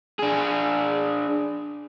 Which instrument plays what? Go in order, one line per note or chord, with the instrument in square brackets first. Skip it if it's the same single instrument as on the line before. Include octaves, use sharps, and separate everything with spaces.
[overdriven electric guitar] D4 G#4